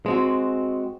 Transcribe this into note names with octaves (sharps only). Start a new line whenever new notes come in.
G#3 C4 F#4